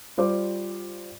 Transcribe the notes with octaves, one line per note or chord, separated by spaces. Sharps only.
G3 F4 C5 D5 D6